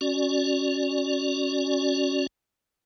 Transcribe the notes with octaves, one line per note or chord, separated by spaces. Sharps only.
C#4 F#4 D5